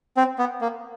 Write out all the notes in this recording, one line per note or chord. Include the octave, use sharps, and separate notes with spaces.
C4
B3
A#3